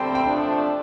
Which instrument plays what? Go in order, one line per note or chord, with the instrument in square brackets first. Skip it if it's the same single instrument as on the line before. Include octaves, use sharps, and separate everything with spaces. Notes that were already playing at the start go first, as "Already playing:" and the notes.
Already playing: [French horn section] D2 D3 G3 C4 [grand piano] G5
[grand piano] G5
[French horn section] C3 F3 A3 D4